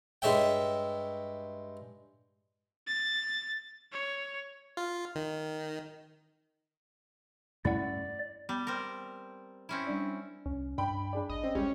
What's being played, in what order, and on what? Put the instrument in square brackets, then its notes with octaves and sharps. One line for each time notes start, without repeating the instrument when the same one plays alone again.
[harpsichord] G2 G#3 C#5 E5 G5
[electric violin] A6
C#5
[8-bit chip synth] F4
D#3
[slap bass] G2 A3 C#4 [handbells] E4 F#5 [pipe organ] D5
[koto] G3 [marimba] B3
[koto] C4 A#4
C4 C#4 E4
[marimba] G3 D4 D5
[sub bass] C2 [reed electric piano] C#4
[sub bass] G2 [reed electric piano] D4 [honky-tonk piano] G5 B5
[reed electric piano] D4 G#4 D5
[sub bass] A1 [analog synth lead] D#5
[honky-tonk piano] C4 [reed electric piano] C#4
[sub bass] A#1 [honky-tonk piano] G3 [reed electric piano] G#3 G4 [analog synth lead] C#4